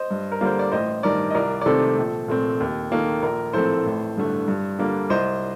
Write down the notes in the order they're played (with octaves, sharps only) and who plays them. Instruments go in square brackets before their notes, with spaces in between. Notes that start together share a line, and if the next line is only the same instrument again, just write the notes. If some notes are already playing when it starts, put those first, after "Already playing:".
Already playing: [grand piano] C5 D#5
G2
A#4
D3 G3 A#3 C5
D5
A1 C5 D#5
G2 D#3 A#4 D5
D#5
C2 A#4 D5
D5
C3 D#3 A3 C4 A4 C5
A#1
A#2 A3 C4
D#2
D#3 A#3 A4
A#1 A#4
A2 F3 A3 C4 A4 C5
A1
G2 D3 A3
G2
D3 G3 A#3
C2 C5 D#5